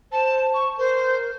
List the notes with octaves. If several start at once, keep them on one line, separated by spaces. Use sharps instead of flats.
C5 A5
C#6
A#4 C5